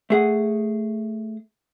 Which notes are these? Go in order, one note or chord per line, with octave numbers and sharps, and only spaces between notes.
A3 G#4 F#5